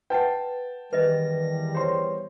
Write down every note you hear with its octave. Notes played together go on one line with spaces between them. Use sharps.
B4 F#5 G5 A5
E2 D#3 G3 B4 D#5 A#6
C5 C#5 C6